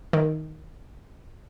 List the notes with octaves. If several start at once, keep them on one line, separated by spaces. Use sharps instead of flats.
D#3